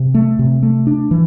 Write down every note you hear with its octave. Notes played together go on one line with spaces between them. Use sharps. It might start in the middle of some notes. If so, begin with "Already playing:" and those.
Already playing: C3
A3
C3
A3
D4
E3